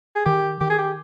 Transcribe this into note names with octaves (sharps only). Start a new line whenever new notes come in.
G#4
D#3 G4
D#3 G4
G#4
G4